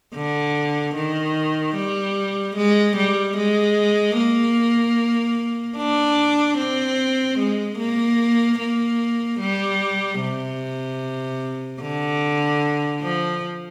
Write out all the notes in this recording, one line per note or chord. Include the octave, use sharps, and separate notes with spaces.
D3
D#3
G3
G#3
G3
G#3
A#3
D4
C4
G#3
A#3
A#3
G3
C3
D3
F3